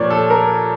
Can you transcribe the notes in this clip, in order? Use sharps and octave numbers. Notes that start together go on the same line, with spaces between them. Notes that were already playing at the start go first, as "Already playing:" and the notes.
Already playing: A#2 F3 C#5 D5
A4
A#4